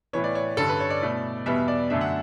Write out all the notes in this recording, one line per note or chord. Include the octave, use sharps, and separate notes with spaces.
A2 E3 B3 C#5
D5
C#5
G2 D3 G3 C#4 A4
B4
C#5
D5
B2 A3 E4
E2 B2 G3 B3 E5
D5
F#2 D3 A3 D4 E5
F#5